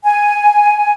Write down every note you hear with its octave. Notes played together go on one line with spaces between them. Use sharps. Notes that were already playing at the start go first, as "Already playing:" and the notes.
G#5